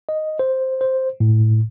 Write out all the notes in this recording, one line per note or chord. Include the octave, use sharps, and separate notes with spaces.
D#5
C5
C5
A2